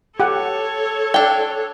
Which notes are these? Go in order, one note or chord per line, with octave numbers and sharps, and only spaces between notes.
G4 A4 C#5 F#5
D4 G5